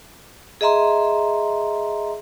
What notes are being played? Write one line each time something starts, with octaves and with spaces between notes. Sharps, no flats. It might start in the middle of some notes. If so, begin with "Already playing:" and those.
G#4 D#5 E5 A#5 C6